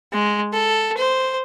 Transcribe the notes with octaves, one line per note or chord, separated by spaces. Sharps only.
G#3
A4
C5